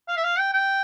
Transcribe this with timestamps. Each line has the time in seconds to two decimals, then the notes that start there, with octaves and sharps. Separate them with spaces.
0.09 F5
0.17 E5
0.23 F5
0.39 G5
0.53 G5